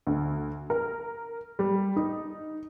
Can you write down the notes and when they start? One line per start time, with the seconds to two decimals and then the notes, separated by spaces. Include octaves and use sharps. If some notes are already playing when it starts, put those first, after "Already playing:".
0.07 D2
0.70 A#4
1.59 G3
1.96 D#4